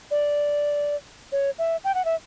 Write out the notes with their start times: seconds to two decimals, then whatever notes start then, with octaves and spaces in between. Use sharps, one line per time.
0.11 D5
1.32 C#5
1.59 E5
1.84 G5
1.95 F#5
2.05 E5